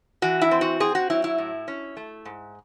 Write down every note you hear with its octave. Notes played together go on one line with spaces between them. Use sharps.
E3 F#4
E4
C4
F#4
C4 G#4
F#4
F#3 E4
E4
A2
C#4
A3
G#2